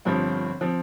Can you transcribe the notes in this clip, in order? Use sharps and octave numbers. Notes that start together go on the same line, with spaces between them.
G1 G2 F3 C4
F3 C4